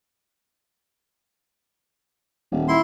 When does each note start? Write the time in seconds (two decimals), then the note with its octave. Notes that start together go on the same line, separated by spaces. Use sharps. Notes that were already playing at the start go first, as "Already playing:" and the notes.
2.52 D#1
2.68 E4 C6